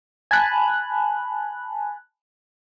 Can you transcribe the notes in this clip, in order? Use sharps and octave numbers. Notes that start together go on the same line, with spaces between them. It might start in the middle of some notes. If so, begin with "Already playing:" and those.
G#5 A5 B5 F#6